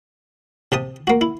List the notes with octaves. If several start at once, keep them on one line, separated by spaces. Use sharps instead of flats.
C3 G4 A5 D#6
A#3 F#4
E4